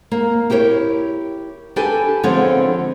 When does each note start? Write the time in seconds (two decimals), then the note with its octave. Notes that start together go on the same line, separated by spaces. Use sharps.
0.11 A#3
0.50 E4 G4 A#4 B4 C#5
1.76 D4 G4 A4 B4 G#5
2.24 D3 F3 G#3 B3 C4 C#5